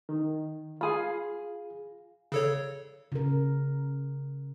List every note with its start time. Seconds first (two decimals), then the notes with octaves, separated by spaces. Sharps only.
0.09 D#3
0.81 F4 G#4 F5 G#5 B5
2.32 C#3 A4 C#5
3.12 C#3 A#4